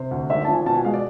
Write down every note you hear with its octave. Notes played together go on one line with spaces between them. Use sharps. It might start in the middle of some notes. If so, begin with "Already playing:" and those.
Already playing: C3 C5
D2
G#1 E5
F3 A5
G#5
B2 A5
G#5
G#3 F5
D5